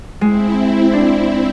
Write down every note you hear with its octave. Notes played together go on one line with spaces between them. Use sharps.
G#3 C4 E4
D4